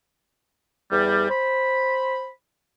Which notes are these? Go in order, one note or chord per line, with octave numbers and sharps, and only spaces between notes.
E2 G3
C5 B5